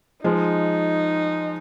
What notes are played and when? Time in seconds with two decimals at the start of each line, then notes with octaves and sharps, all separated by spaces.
0.24 F3 G#3 D#4